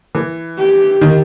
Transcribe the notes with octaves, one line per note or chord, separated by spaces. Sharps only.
E3
G4
D#3